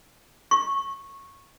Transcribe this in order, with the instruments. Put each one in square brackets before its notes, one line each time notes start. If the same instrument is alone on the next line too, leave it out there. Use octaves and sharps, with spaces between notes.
[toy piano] C#6